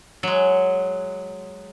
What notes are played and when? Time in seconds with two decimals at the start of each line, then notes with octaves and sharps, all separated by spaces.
0.23 F#3 G#3